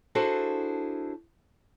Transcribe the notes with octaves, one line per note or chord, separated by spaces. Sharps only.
D4 E4 F#4 G#4 A4 C5